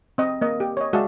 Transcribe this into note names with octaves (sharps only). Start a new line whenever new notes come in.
C4 D#5
A#3 D#5
G4
C#5 D#5
G#3 F#4 D5 E5 F5 A5